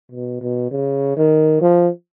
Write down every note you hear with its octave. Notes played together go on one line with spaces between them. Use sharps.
B2
B2
C#3
D#3
F3